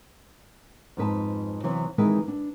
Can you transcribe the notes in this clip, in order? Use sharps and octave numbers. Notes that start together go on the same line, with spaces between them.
F2 G#2 B4 A5
C3 E3 F#3 B3
D#3 E3 G#3 C4 E4 B4
D4